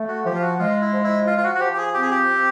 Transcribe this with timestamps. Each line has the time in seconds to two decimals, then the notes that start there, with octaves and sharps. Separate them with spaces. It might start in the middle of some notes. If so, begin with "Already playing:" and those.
Already playing: A3
0.08 F#4
0.25 F3 G4
0.35 F4
0.42 F#4
0.59 G#3 F4
0.81 E4
0.93 F3
1.04 E4
1.27 F3 F4
1.38 F4
1.44 F#4
1.55 F#4
1.60 F3 G4
1.73 G4
1.78 G#4
1.94 C4 G4
2.02 G#4
2.11 G4
2.28 C4